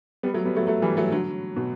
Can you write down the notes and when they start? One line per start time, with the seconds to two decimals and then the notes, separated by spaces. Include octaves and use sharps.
0.23 G3 B3
0.34 F#3 A3
0.45 G3 B3
0.56 F#3 A3
0.67 F#3 A3
0.82 E3 G3
0.97 F#3 A3
1.11 D3 F#3
1.56 B2